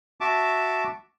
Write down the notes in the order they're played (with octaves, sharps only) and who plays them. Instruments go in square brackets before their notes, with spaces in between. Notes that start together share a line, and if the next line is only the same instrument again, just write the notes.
[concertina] F#4 E5 A5 D6